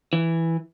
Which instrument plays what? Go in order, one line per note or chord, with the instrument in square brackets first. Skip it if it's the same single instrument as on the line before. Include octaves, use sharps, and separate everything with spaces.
[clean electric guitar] E3